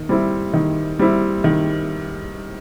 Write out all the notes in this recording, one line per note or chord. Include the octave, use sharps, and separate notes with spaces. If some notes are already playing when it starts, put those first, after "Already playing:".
Already playing: D#3
G3 C4 E4
D#3
G3 C4 E4
D#3